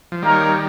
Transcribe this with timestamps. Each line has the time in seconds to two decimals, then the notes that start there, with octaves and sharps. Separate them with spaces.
0.12 F3
0.22 D#3 G3 A#3 D#4 A#4 C#5